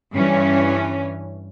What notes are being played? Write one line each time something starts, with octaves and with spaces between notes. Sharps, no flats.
G2 E3 C#4